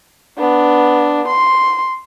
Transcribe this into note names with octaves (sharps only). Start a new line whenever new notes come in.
B3 D4
C6